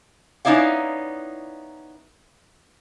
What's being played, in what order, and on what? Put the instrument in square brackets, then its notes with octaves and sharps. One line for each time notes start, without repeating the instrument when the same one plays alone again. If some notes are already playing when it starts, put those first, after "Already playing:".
[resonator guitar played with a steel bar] B3 C#4 D#4 E4 D5 F5